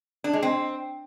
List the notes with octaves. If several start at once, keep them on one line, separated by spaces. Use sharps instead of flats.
D4
G#3
C4